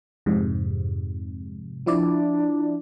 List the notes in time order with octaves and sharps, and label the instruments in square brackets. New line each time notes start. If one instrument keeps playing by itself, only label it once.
[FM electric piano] F2 G#2 C3
[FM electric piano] F3 E4 D5 [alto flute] D4